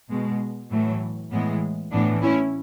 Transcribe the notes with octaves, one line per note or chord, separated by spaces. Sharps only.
B2 G#3
A2 E3 F#3 A3
A2 E3 G#3 B3
A2 E3 B3 D4
C#4 E4